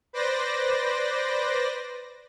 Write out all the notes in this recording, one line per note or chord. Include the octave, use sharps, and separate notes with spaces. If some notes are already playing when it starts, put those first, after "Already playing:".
B4 C5 D5 A#6